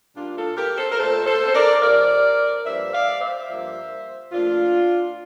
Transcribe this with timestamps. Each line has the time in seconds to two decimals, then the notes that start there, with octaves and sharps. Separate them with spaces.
0.15 A#2 G3 A#3 D4 F4
0.37 F4 A4
0.57 G4 A#4
0.78 A4 C5
0.92 A#4
0.99 A#2 A3 A4 C5
1.26 A4 C5
1.46 C5
1.55 A#4 D5
1.82 C3 F3 A#3 A#4 D5
2.66 G2 F3 A#3 C5 E5
2.93 D5 F5
3.21 C5 E5
3.49 G2 F3 A#3
4.32 A#2 F3 A3 D4 F4